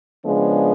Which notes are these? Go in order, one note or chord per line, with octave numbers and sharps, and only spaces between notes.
C#3 F3 G#3 B3 D4